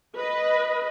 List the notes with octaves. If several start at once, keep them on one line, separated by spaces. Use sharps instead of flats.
B4 D#5